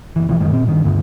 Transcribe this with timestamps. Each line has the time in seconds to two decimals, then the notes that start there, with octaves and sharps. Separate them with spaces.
0.16 F#1 E3
0.29 B1 E3 F3
0.40 F#2 D#3 G#3
0.52 A#2 C4
0.66 G2 D#3
0.84 D2 G2 D3 B3